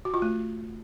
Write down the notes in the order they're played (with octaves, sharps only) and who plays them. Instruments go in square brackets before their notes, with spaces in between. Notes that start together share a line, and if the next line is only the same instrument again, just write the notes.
[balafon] F#4
F4
A3